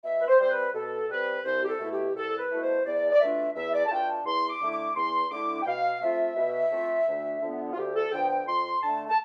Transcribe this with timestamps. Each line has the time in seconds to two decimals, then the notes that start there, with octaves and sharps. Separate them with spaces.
0.04 B2 E5
0.19 B4
0.28 C5
0.40 G3 C4 C5
0.51 B4
0.74 B2 A4
1.10 G3 C4 B4
1.45 C2 C5
1.62 G4
1.69 A4
1.79 B2 A3 E4
1.92 G4
2.14 C2 A4
2.38 B4
2.50 B2 A3 E4
2.62 C5
2.85 E2 D5
3.12 D5
3.20 B2 A3 D4 F4 E5
3.55 E2 E5
3.72 D5
3.86 A5
3.91 B2 A3 D4 F4 G5
4.08 A5
4.25 E2 C6
4.49 D6
4.61 D3 A3 E4
4.72 D6
4.96 E2 C6
5.31 D3 A3 E4 D6
5.62 G5
5.66 B2 F5
6.01 A3 C4 F4 E5
6.36 B2
6.71 A3 C4 F4
7.07 D2
7.42 D3 F3 B3
7.73 F4
7.76 D2 G4
7.94 A4
8.11 D3 F3 B3 G5
8.30 G5
8.47 F2 C6
8.82 D3 A3 A5
9.08 A5